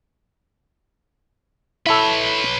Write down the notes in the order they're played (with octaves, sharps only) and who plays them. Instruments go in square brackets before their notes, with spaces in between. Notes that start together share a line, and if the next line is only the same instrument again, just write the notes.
[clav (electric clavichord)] E4 A4 [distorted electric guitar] B4 C#5